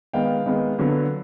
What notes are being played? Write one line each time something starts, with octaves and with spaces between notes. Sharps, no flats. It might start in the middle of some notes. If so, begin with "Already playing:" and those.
D#3 G#3 B3 F5 G5
D#3 G#3 B3
D3 F#3 B3